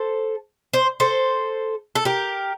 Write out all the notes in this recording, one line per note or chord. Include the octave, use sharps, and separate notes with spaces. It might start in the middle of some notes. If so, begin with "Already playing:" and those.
Already playing: A4 C5
C5
A4 C5
A4
G4 A#4